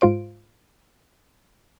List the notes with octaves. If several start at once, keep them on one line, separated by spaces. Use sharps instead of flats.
G#2 F4 C5 D7